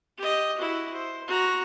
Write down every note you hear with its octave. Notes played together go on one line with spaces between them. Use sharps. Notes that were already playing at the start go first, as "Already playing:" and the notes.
G4 D#5
E4 F#4
C5
F#4 A#5